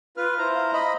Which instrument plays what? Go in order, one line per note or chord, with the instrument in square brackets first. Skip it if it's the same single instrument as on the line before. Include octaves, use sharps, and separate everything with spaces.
[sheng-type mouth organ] F4 B4 [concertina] F6
[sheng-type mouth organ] E4 C5 A#5
[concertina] F5
D#5 B5